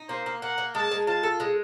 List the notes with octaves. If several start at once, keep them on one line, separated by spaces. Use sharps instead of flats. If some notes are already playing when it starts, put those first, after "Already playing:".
Already playing: D#4
A#3 C5
A#3
A#3 F#5
A#3
G#3 A5
G#3
F4 A5
A4
G#3